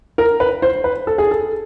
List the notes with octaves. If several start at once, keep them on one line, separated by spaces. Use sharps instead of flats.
A#4
B4
C5
B4
A4
G#4
A4